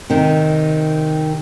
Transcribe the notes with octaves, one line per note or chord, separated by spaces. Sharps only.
C3 D#3